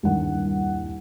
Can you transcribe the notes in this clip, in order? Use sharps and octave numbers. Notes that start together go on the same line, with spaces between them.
D#1 C2 G2 D#3 F#5